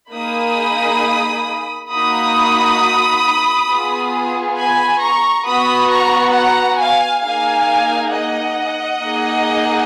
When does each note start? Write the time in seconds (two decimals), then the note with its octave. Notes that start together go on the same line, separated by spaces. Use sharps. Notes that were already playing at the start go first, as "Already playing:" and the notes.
0.13 A#3 D#4 G#4 B5 D#6
1.91 A#3 D#4 F#4 B5 D#6
3.68 B3 F4 G#4
4.57 G#5 B5
5.01 A#5 C#6
5.46 B3 F#4 B5 D#6
5.90 A#5 C#6
6.35 F#5 A#5
6.79 F5 G#5
7.23 A#3 D#4 G#4 F5 G#5
8.12 D#5 F#5
9.02 A#3 D#4 G#4